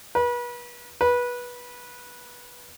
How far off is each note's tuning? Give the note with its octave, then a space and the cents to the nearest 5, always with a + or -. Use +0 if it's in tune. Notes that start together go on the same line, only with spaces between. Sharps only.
B4 -35
B4 -20